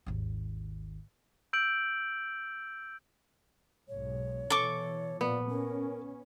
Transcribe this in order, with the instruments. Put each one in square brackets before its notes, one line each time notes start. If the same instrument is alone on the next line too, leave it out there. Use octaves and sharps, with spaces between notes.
[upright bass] G#1 D#2
[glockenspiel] E6 G6 D7 F#7
[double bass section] B1 G#2 [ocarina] C#5
[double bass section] B2 E3 [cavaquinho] A4 C#6 D6
[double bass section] A#2 F3 [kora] B3 [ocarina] D5
[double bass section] C#4 [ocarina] A#4